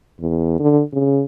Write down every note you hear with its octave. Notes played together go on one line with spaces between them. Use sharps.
E2
D3
C#3